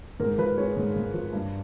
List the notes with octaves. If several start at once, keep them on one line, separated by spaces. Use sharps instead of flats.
G#2 A#4
F3 B4
G#3 C#5
G#2
G#2
F3
G2